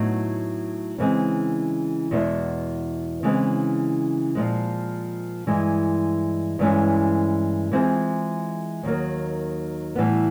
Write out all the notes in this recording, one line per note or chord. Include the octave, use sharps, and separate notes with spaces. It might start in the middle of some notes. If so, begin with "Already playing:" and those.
Already playing: A2 F#3 B3 D#4
C#3 E3 G#3 C4
E2 B2 G#3 B3 E4
C#3 E3 G#3 C4
A#2 F3 G#3
G2 E3 G#3
G2 E3 G#3 C#4
E3 G#3 C4 F4 G#4
D#2 D#3 F#3 A#3
A2 E3 G3 B3